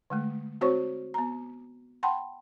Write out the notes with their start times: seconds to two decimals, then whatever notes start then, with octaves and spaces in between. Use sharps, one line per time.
0.10 D3 G#3 A3
0.61 C4 F#4 C5 C#5 C#6
1.14 B3 A#5
2.03 F#5 G5 A5 B5 C6